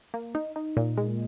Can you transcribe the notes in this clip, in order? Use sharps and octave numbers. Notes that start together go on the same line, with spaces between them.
A#3
D#4
D#4
A#2
G#3